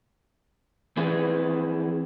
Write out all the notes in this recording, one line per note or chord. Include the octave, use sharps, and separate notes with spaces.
E3 C4 E4 G#4 B4